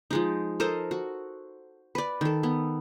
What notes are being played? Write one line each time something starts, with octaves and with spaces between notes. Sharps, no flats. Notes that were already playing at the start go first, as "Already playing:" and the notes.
F3 G#3 D#4
A4 A#4 C5 D#5
F#4
B4 D5
D#3 A4
B3